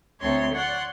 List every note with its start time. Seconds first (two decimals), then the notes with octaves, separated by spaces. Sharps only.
0.20 D2 A3 C4 C#5 C6
0.53 C#5 D5 F#5 C6